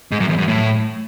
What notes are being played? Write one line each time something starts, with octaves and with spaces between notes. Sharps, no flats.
G#2
F#2
E2
F#2
A2